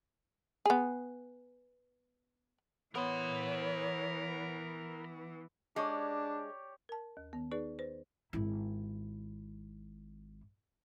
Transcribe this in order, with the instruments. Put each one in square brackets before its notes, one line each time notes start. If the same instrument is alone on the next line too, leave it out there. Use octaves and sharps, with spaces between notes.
[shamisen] B3 G#4
[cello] E3 [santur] B3 [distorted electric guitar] A#4 C6 [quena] C#5
[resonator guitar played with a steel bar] G#3 [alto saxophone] D4 [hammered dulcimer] G4 C#5 D5
[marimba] A#4 A5
D#2
D#3 B3
D#4 G#4 B4 D5
B4 C5
[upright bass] G#1 E4